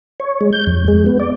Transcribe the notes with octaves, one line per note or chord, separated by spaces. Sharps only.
C#5
G#3
G6
F2
G#3
B3
D5